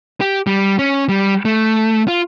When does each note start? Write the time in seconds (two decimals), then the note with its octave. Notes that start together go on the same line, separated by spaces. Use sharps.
0.21 G4
0.47 G3
0.79 C#4
1.09 G3
1.45 A3
2.08 F4